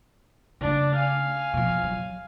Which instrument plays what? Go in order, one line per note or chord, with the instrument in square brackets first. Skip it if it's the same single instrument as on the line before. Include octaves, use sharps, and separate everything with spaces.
[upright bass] C#3 A3 [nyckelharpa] D4
[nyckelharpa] F5 G#5
[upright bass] B2 F3
F#3